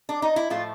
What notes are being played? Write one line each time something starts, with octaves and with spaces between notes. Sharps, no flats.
D4
D#4
E4
A2 F3 A3 F4